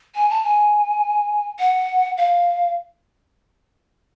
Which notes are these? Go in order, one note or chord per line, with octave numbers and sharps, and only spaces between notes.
G#5
A5
G#5
F#5
F5